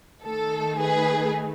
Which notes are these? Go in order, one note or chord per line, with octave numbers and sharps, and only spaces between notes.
D#3 A3 D#4 A4
G#4 B4